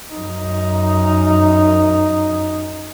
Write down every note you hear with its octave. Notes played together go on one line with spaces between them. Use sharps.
F#2 D#4